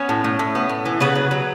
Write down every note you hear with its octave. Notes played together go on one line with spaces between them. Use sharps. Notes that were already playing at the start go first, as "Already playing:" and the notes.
Already playing: B3 C#4 C#5
A2
A2
A2
B3
A2
E3
C#3 B3 B4
F#3
F#3